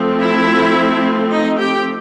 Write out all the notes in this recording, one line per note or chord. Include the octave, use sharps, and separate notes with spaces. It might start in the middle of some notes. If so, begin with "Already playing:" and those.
Already playing: F3 A3 C4
E4 E5
D#4 D#5
G4 G5